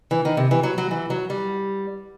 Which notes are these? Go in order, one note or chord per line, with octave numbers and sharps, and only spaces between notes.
E3
D#3
C3
E3
F#3
F#3
E3
F#3
G3